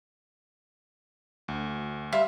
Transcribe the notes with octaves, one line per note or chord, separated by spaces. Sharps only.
D2
G3 E5 F5 C6